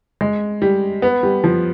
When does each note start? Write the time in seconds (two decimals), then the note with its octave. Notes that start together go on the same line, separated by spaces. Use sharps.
0.21 G#3
0.62 G3
1.02 B3
1.23 G3
1.44 F3